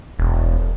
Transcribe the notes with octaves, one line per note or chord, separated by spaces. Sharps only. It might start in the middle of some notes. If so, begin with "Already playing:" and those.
E1